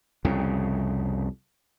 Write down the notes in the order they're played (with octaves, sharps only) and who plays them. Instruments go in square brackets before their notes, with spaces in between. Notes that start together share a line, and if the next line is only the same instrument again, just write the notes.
[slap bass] C2 F2 C#3